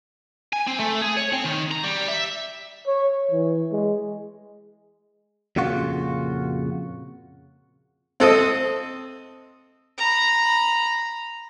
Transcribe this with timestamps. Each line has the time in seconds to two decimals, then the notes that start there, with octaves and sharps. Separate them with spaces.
0.53 G#5
0.67 C4
0.80 A3
1.02 G#4
1.17 C#5
1.33 C4
1.45 D#3
1.71 A#5
1.83 G3
2.08 E5
2.87 C#5
3.31 E3
3.71 G#3
5.56 F2 A#2 C#3 F4 F#4
8.20 C4 A4 D#5
9.98 A#5 B5